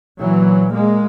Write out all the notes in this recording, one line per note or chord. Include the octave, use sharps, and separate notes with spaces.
A#2 E3 F#3
G#3 A#3